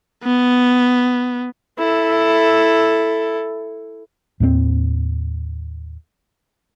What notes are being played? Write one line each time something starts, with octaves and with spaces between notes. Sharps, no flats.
B3
E4 A4
D#2 A2 G#3 C4